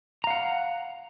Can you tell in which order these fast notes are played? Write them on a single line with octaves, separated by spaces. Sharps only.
A#5 F5 F#5